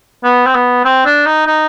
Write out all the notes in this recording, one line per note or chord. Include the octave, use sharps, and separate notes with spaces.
B3
C4
B3
C4
D4
D#4
D#4